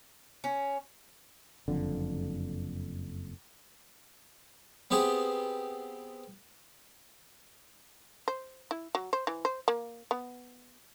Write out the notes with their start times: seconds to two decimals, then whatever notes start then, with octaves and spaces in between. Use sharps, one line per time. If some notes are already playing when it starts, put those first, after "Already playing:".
0.44 C#4
1.68 F#1 F2 D3
4.91 B3 C4 G4 G#4 C5
8.28 C5
8.71 E4
8.95 F#3
9.13 C5
9.27 E3
9.45 C5
9.68 A#3
10.11 B3